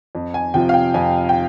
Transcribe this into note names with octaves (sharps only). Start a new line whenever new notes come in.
F2
G#5
C3 F3 G5
F5
G5
F2 G#5
G5